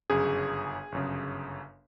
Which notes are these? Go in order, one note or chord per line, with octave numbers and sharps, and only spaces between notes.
G1 F#2 C#3 G#4
G1 F#2 C#3